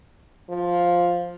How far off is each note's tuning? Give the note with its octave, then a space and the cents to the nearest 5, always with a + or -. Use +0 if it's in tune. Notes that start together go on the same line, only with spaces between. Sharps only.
F3 +5